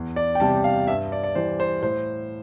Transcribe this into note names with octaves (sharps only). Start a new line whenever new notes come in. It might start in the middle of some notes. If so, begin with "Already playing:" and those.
Already playing: E2
D5
G5
C3 G3 A5
F5
G2 E5
D5
D5
E3 G3 C5
C5
A2 C5